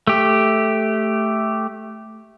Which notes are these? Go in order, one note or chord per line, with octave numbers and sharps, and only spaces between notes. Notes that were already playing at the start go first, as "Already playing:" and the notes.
A3 G4